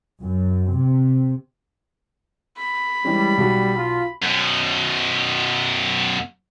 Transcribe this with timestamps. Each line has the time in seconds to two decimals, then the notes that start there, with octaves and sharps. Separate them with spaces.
0.23 F#2
0.78 C3
2.57 B5
3.05 E3 G3 G#3 C#4
3.38 B1 F#4
3.76 F4
4.22 F#2 B2